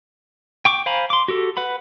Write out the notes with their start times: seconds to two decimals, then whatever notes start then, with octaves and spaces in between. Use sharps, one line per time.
0.65 G5 C#6 D6
0.86 C5 F5 G#5 A#5 B5
1.10 C6 D6
1.28 F#4 G4 A4
1.57 B4 F#5 B5